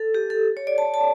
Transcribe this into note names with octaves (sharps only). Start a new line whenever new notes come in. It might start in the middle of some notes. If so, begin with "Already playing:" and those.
Already playing: A4
G4
A4
C#5
D5
A5
A5